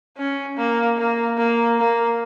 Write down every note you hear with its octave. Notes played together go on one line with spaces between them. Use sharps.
C#4
A#3
A#3
A#3
A#3